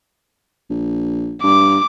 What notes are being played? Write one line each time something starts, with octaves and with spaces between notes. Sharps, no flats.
A#1
G2 D6